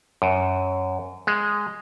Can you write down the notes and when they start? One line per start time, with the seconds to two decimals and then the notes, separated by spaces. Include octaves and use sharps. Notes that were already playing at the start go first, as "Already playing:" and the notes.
0.22 F#2
1.27 G#3